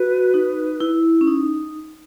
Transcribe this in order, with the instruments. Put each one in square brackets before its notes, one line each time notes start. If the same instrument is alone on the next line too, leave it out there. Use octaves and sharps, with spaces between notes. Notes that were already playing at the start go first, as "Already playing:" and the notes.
Already playing: [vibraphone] F#4 [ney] B4
[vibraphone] D#4
E4
C#4
D#4